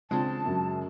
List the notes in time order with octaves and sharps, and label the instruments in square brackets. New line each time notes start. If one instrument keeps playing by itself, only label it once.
[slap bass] C#3 G#3 [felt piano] C4 D4 F4 [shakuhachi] A5
[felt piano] F#2 F#3